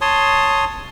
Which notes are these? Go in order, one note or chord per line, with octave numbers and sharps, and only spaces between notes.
C#5 A5 C6 D#6